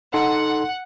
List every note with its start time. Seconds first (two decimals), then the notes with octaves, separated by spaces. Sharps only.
0.14 D#4 A4 F#5 C6